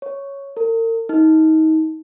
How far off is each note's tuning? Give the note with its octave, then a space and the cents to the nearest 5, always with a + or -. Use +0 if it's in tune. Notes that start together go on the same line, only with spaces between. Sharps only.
C#5 +0
A#4 -40
D#4 +25